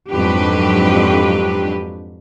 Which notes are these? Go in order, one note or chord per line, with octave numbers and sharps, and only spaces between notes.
F2 G#2 F#3 D4 G4 B4